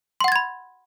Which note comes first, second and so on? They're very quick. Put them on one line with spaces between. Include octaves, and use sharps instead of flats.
C6 F#5 A6 G#6 B5